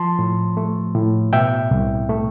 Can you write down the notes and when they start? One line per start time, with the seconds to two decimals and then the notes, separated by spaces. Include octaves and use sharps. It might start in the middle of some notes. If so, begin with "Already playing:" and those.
Already playing: F3 A5 C6
0.19 A2
0.57 A3
0.95 A2
1.33 B2 E5 G5
1.71 C2
2.09 A3